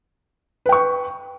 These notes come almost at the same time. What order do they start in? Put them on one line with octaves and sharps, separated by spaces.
B4 G5 C#6